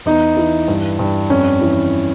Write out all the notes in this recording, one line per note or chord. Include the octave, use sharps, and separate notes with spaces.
E2 D#4
E3
G2
G2
F2 C#4
E3